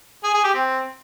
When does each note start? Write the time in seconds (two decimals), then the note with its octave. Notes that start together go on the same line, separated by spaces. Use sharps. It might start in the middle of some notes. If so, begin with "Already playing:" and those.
0.24 G#4
0.34 G#4
0.44 G4
0.54 C4